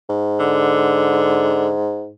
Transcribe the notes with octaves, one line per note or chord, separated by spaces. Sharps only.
G#2
D3